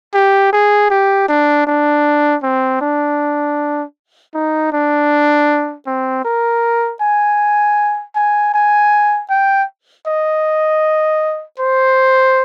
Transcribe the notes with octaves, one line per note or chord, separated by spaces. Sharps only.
G4
G#4
G4
D4
D4
C4
D4
D#4
D4
C4
A#4
G#5
G#5
G#5
G5
D#5
C5